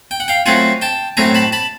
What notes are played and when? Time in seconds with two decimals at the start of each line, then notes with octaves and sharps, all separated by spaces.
0.11 G5
0.20 F#5
0.28 F5 G5
0.46 F#3 A3 C4 F4 F#5 G#5
0.82 G5 A5
1.17 A2 F#3 A3 C4 G#5 A#5
1.35 A5 B5
1.53 A5 B5